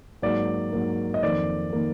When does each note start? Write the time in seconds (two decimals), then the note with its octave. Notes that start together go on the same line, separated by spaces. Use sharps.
0.22 G#2 F#3 A#3 D5
0.72 G#2 F#3 A#3
1.14 D#5
1.23 F2 D#3 A#3 D5
1.73 D#3 A#3